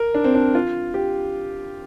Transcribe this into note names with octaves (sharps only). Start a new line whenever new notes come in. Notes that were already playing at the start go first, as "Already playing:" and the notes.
Already playing: A#4
D4
C4
D4
F4
G4